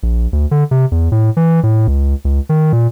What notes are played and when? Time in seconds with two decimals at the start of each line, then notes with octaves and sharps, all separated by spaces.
0.03 A#1
0.33 D2
0.51 D3
0.71 C3
0.92 E2
1.12 A2
1.37 E3
1.63 A2
1.87 C#2
2.25 C#2
2.49 D#3
2.73 A#2